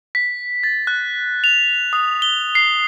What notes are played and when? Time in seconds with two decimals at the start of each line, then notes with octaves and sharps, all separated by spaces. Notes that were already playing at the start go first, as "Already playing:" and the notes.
0.15 B6
0.63 A6
0.87 F#6
1.44 F7
1.93 D#6
2.22 G7
2.55 C7